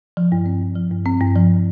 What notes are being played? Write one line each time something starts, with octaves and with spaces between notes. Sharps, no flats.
F3
G2
C4
G2
F3
G2
C4
G2
F3